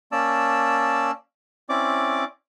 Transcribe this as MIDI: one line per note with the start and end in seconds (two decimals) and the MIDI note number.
0.12 1.11 58
0.12 1.11 61
0.12 1.11 74
0.12 1.11 81
0.12 1.11 88
1.69 2.25 60
1.69 2.25 61
1.69 2.25 64
1.69 2.25 74
1.69 2.25 86